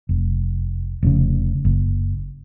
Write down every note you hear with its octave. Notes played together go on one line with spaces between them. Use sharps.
F1
F1 G#2 C#3
F#1